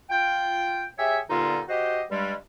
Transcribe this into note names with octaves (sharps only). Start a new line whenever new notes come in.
F4 G5
G4 G#4 C#5 E5
G2 A#2 D3 B3 D#4 F4
F#4 G4 C5 D#5
G2 G3 G#3